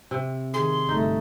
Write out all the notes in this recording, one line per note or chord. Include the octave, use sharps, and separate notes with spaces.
C3
D#3 G#4 C6
G1 A3 D#4